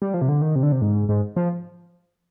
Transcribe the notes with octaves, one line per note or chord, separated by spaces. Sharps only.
G3
F3
C3
D3
D#3
C3
D3
C3
G#2
G#2
F3